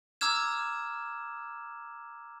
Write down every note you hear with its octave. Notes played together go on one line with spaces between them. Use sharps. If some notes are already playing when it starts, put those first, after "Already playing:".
A#5 D6 E6 F6 G#6 E7